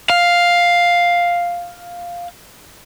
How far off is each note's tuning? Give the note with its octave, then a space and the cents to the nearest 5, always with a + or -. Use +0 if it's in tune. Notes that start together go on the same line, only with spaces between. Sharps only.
F5 +5